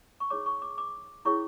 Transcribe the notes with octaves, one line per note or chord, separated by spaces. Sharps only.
C#6
D#4 G#4 C#5 D6
C#6
D6
D6
C#4 E4 G#4 C#5 C#6